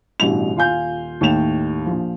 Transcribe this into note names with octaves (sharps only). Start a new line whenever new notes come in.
A1 G2 B2 G3 E4 F7
D#1 F4 F5 G#5 G6
D#2 A2 D#3 G5 E7 F7
A#1 F3